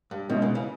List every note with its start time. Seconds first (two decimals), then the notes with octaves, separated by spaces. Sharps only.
0.11 G2
0.30 G#2 B2 G#3 C#4 E4
0.42 C#3 E3
0.55 C#3 E3